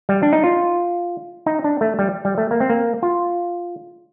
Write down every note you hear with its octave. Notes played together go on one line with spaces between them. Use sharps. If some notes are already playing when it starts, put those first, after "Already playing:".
G3
D4
D#4
F4
D#4
D4
A3
G3
G3
A3
A#3
C4
A#3
F4